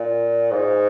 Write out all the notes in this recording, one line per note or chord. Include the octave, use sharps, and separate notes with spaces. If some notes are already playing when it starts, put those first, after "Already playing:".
Already playing: A#2
G#2